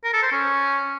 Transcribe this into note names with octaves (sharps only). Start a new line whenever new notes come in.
A#4
A4
C5
C#4